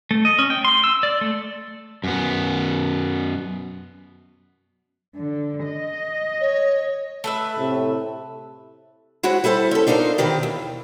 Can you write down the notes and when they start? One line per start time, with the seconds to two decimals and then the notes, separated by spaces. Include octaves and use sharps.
0.11 A3
0.25 D#5
0.39 C#4
0.50 G5
0.65 C6
0.84 E6
1.03 D5
1.21 A3
2.04 F#2 B3
5.15 D3
5.66 D#5
6.40 C#5
7.24 A3 B4 E5
7.57 A2 C3
9.23 G#3 E4 F#4 C5 C#5
9.44 G3 E4 A4 C5
9.71 C#4 A4
9.87 D4 D#4 F4 A4 A#4 C5
10.18 B2 D#3 E3 G4
10.43 D#2